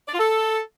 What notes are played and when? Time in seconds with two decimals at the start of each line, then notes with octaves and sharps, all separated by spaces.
0.07 D5
0.13 F4
0.18 A4